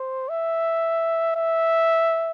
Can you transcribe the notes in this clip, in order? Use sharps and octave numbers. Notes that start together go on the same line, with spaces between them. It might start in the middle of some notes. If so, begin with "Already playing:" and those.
Already playing: C5
E5
E5